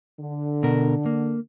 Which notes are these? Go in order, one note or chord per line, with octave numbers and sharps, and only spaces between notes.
D3
B2 A#4
A#3